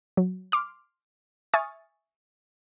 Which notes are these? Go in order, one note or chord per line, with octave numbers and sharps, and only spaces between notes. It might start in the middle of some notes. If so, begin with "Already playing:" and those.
F#3
C6 D6 F6
E5 G#5 C#6 D#6 F6 A6